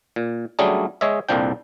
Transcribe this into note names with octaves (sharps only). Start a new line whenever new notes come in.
A#2
F#3 G3 A3 C#4 D4 G#4
G#3 C#5 D#5 E5
C2 F2 A#2 F3 D4 G5